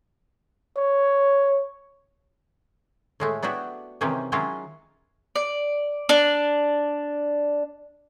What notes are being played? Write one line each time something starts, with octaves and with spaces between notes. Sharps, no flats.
C#5
A2 G#3 A3
B3 D4 E4 F#4 G4
C3 D#3 E3 G#3 C#4 G4
D#3 F#3 G#3 C#4 E4 F4
D5
D4